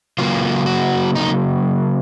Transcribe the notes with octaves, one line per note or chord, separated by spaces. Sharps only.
C#3 F#3 A#3 F4
F#4
D#4